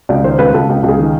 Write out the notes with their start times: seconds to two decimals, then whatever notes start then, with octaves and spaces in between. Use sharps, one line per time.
0.09 C#2 D5
0.23 D#3 C5
0.38 C#2 B4
0.54 C#2 A4
0.69 C#2
0.83 C#2
0.88 G#4
0.99 D#3